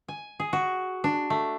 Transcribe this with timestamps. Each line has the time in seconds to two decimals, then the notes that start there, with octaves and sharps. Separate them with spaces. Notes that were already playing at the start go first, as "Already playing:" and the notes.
0.08 G#5
0.40 G#4
0.53 F#4
1.04 D4
1.30 A3